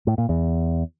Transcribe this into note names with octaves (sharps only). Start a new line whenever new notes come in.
A2
A#2
E2